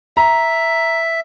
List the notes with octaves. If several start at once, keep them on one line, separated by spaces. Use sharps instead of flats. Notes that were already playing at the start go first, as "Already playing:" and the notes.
E5 A#5